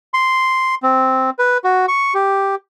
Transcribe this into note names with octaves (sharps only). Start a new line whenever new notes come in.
C6
C4
B4
F#4
C#6
G4